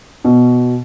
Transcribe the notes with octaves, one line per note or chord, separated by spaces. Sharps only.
B2